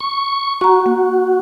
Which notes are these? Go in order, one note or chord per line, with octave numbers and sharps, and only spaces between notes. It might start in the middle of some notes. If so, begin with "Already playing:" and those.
C#6
F#4 A#5 C#6
A#3